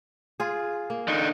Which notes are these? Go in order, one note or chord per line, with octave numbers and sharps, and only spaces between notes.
F4 G#4
A#3
D3 D#4